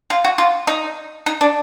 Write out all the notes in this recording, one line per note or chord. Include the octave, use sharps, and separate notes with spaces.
F4
F#4
F4
D#4
D#4
D4